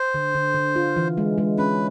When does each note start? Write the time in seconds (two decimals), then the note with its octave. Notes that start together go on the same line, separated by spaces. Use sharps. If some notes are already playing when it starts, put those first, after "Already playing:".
Already playing: C5
0.14 D3
0.35 D3
0.55 D3
0.76 F4
0.96 E3
1.18 G#3
1.38 G#3
1.58 C#4 B4